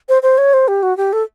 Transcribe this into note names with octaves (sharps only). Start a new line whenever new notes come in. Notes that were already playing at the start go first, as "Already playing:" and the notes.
C5
C5
C#5
C5
G4
F#4
G4
A4